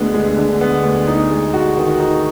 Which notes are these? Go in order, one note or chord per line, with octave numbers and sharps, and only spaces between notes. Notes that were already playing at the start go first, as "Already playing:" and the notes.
Already playing: D2 D3 G#3 B3
G#3
D3
B3
D2
D#4
G#3
F#4
D#3
D#4